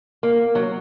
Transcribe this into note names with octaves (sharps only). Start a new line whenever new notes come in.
A#3
F#3